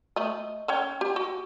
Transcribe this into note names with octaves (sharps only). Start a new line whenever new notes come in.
A3 D#5
C#4 C#5 G5
G4
F#4